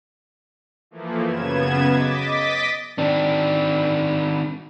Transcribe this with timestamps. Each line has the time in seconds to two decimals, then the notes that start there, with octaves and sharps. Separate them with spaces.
0.91 E3 F3 A3 A#3
1.24 F#2 C#3 B3 G#6 E7
1.88 D#5 D6 A6 B6
2.98 D#3 C4 D4